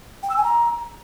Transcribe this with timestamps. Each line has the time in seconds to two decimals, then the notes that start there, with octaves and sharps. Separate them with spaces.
0.23 G5
0.30 E6
0.36 G#5
0.43 A#5